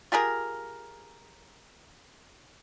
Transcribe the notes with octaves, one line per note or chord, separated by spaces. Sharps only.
F4 G4 G#4 A#4